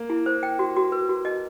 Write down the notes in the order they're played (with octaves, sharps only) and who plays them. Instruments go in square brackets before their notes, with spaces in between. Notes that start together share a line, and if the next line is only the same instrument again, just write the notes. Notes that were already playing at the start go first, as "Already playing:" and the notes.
Already playing: [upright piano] A#3
[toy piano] E4
C5
G5
F#4
F#4
B4
F#4
D#5